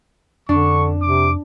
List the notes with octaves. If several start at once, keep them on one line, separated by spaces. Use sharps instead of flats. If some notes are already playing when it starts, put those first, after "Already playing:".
F2 D3 D4 C#6
C3 D6